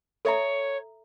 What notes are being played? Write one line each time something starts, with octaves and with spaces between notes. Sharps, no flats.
A4 C#5 E5 A#5